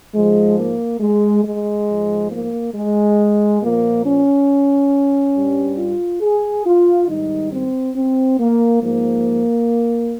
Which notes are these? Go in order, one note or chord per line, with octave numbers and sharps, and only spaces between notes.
G#2 F3 G#3
A#3
G#3
G#3
G#2 F3
A#3
G#3
A#2 F3 A#3
C#4
G2 G3
F4
G#4
F4
G#2 D#3 G3 D#4
C4
C4
A#3
G#2 F3 A#3